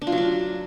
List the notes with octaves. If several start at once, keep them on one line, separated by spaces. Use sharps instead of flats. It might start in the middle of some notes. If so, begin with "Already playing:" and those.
D4
F4
F#3
D4